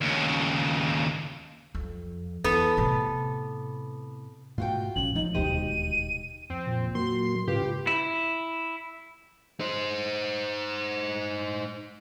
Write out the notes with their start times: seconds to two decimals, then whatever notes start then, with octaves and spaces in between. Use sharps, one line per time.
0.01 D#2 C#3
1.75 F2
2.44 E2 B3 A4
2.77 A2 C3
4.58 G#2 B2 A3 F4 F#4 G5
4.96 A#1 F2 A#2 C#4 F#7
5.15 F3 F#3 D#4
5.34 D#1 D2 B2 G#3 D#4 G4 C5 D#7
6.50 F2 C4
6.67 A#2
6.95 F#3 A#3 C6
7.48 G#2 C#3 F4 G4 B4
7.87 E4
9.60 D#4 C5